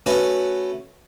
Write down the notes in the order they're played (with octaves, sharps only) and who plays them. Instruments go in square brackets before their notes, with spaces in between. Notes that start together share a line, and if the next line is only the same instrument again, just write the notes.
[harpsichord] A3 C#4 F#4 B4